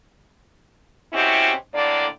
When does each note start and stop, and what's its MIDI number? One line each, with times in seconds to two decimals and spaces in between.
1.13 1.51 47
1.13 1.51 60
1.13 1.51 61
1.13 1.51 64
1.13 1.51 66
1.13 1.51 67
1.73 2.05 45
1.73 2.05 50
1.73 2.05 58
1.73 2.05 74